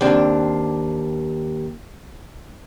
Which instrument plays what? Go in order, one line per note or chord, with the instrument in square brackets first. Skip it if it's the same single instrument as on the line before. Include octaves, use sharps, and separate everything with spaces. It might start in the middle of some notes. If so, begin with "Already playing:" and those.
[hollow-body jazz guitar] D#2 C4 D4